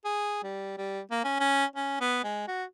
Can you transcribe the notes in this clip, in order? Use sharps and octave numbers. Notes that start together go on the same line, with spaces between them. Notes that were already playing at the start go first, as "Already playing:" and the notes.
G#4
G3
G3
A#3
C#4
C#4
C#4
B3
G#3
F#4